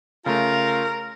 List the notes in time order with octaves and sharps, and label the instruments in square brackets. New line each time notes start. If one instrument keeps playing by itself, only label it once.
[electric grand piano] C#3 A3 [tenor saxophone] F4 [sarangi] A#4